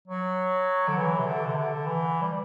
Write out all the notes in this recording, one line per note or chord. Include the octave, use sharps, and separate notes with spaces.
F#3
D3
E3
C3
D3
C3
D3
E3
G3